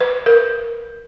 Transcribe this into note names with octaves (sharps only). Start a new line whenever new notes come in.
B4
A#4